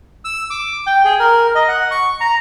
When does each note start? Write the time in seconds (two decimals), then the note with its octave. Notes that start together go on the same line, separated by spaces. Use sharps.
0.25 E6
0.50 D6
0.87 G5
1.05 G#4
1.20 A#4
1.55 D#5
1.68 F#5
1.91 C#6
2.21 A#5